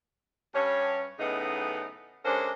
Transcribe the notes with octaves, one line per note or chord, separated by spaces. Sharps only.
G2 C#4 C#5
F#2 A2 C#3 B3 D#4 D#5
D3 G#3 C#4 D4 A#4 C5